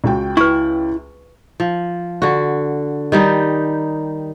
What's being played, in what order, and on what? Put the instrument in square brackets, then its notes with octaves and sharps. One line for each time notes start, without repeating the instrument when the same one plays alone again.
[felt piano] C#2 F#4 G5
[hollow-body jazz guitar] E4 [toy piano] B4 C#6
[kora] F3
D3 F#4
D#3 G3 D#4